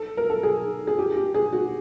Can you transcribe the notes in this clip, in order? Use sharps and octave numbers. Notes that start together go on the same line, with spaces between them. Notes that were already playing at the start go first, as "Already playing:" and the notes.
Already playing: A4
A#4
A4
G#4
G#4
G4
G4
G#4
F#4